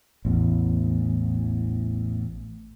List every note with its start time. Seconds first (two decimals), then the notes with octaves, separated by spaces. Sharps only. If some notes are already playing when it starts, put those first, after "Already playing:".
0.25 A1 E2